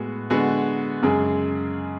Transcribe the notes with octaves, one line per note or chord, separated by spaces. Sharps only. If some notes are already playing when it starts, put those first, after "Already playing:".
Already playing: A2 G#3 B3 F#4
D3 G#3 B3 F#4
F#2 C#3 G#3